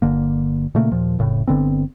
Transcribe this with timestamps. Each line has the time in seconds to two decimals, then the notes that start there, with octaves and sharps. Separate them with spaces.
0.02 G1 D3 A#3
0.75 A#2 C#3 A3 A#3
0.92 D#2 A#2 F3
1.19 F1 A2 C#3
1.48 G1 D3 B3 C4